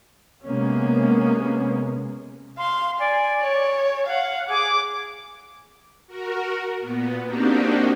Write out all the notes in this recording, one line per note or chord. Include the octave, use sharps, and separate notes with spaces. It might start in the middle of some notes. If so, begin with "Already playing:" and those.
C3 G#3 A#3 B3 C#4
F5 C6
D5 G#5
C#5
F5 F#5
G#4 D6
F#4 A#4
A#2 B3
A#3 C4 D4 D#4 F#4 G4